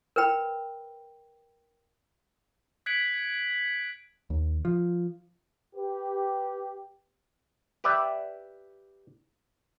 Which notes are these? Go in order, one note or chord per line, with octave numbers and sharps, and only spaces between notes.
A#4 B4 G5 B5
F#6 G#6 B6 C#7 D7 F#7
D#2
F3
G4 B4
G4 B4 D5 E5